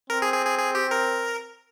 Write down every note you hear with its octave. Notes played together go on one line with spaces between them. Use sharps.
C4 A#4
G#4
G#4
G#4
G#4
G4
A#4